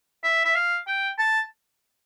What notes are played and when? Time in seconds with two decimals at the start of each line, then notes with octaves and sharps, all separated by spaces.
0.23 E5
0.45 E5
0.55 F5
0.87 G5
1.19 A5